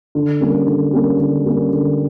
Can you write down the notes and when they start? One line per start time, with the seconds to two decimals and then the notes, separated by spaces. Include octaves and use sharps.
0.15 D3
0.41 G3 A#3 C#4
0.66 D3
0.93 G3 A#3 C#4
1.19 D3
1.45 G3 A#3 C#4
1.73 D3